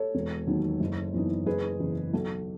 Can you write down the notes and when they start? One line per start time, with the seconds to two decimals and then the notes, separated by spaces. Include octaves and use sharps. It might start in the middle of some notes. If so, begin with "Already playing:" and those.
Already playing: A4 C#5
0.15 E1
0.47 D#2 D#3 F#3
0.80 F#1
1.14 F#2 E3 B3 D#4
1.46 F#1 G#4 B4
1.80 E2 C#3 E3
2.13 B1 A4